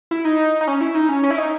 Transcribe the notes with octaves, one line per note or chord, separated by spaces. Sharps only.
E4
D#4
D#4
C#4
E4
D#4
C#4
C#4
E4
D#4